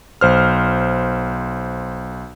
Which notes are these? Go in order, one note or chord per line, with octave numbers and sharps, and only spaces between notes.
B1 C5 F6